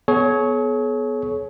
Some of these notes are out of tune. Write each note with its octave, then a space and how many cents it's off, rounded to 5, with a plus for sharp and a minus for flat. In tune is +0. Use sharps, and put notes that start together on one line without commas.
B3 +0 G#4 +45 C#5 +0